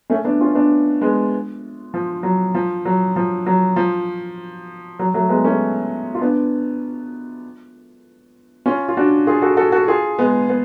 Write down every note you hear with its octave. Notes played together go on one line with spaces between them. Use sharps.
A3 C#4
B3 D4
C#4 F4
B3 D4
G#3 B3
F3
F#3
F3
F#3
F3
F#3
F3
F#3
F#3 A3
G#3 B3
A3 C#4
F4
B3 D4
C#4 F4
F4
D4 F#4
F4 G#4
F#4 A4
F#4 A4
F#4 A4
F4 G#4
G#3 B3
B3